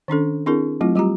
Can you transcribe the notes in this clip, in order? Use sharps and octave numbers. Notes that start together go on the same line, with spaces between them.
D#3 C#4 D4 A4
C4 D4 E4 G#4 A#4
F#3 A3 C4 E4 F4
G3 F4 G4 A#5